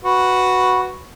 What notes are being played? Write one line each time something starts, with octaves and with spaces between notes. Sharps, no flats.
F#4 B4